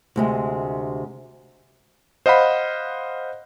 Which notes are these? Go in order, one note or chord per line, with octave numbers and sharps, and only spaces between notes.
D2 C3 G#3
C5 D#5 F5 F#5 B5